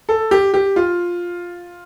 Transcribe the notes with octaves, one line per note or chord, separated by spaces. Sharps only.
A4
G4
G4
F4